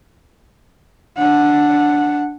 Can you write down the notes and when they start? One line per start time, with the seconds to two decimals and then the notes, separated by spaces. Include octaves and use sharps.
1.18 D4 F#5